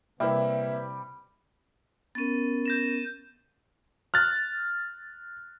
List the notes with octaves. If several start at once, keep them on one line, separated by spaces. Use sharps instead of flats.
C3 G3 A#3 E4 B4 E5
B3 C#4 A#4 A6 D#7
G6 A#6 E7
F6 F#6 A6